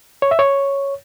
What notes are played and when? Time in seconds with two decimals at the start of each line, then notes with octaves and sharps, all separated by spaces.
0.22 C#5
0.31 E5
0.39 C#5